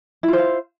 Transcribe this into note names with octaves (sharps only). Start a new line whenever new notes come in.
E4 F4 C5 F5